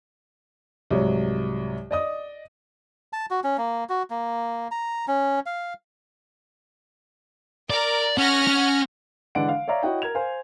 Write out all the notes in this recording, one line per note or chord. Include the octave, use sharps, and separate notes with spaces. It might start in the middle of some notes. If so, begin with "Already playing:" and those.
C2 G#2 F#3
D5 D#5 D#6
A5
F#4
C#4
A#3
F#4
A#3
A#5
C#4
F5
A#4 D5
C#4 F#5 F6 A#6
C#4
D3 E3 G#3 D4 F#5 D7
F5
C#5 D5 E5 F5 A#5
E4 F#4 C#5 D#5 F#5 G5
A#4 G#6 F7
C5 F5 G#5